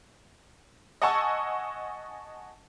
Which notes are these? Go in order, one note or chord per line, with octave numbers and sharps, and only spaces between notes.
D#5 F#5 G#5 A5 C#6 E6